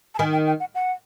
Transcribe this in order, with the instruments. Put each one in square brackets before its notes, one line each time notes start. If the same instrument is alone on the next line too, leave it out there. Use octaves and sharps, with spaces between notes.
[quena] A5
[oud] D#3 [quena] G#5
[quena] G5
G5
F#5
F#5